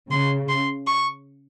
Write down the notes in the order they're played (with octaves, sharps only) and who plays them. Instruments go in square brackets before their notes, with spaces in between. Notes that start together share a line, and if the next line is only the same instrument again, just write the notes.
[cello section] C#3 [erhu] C6
[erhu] C6
C#6